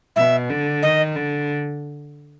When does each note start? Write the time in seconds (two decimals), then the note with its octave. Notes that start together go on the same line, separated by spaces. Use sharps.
0.16 B2 E5
0.50 D3
0.82 D#3 D#5
1.16 D3